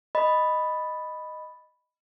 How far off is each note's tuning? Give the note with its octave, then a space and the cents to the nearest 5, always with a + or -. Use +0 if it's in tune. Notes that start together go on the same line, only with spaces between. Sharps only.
D#5 -5 B5 +0